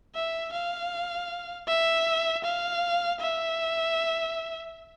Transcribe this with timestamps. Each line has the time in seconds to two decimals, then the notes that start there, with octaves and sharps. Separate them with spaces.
0.15 E5
0.53 F5
1.68 E5
2.44 F5
3.21 E5